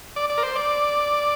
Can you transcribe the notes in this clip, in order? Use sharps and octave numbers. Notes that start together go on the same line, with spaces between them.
D5
D5
A#4
C5
D5